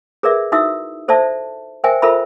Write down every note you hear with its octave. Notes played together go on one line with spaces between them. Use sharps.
G#4 A#4 B4 D5 E5
D#4 E4 F#4 E5 D#6 E6
A4 C5 D5 E5 A5
A#4 C5 E5 G5 G#5
F4 A4 A#4 C5 E5 B5